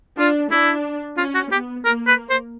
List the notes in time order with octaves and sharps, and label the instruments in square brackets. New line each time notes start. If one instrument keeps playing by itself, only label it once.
[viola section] D4 [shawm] F4
[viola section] D4 [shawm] E4
[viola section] C#4 [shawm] F4
[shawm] F#4
[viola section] B3 [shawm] G4
[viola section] A#3 [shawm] A#4
[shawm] B4
C5